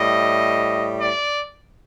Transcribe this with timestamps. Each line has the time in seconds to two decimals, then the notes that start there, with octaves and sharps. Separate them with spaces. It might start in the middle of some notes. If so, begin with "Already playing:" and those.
Already playing: A2 G3 D#5
1.00 D5